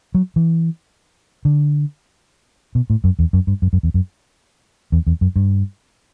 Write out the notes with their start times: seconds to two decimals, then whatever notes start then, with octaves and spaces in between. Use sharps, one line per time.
0.14 F#3
0.36 E3
1.45 D3
2.75 B2
2.90 A2
3.04 F#2
3.19 E2
3.33 F#2
3.47 G2
3.62 F#2
3.73 F#2
3.83 E2
3.94 F#2
4.92 E2
5.07 E2
5.21 F#2
5.36 G2